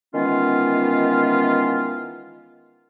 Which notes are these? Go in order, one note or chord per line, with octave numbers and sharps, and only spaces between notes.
D#3 E3 G#3 B3 C#4 F4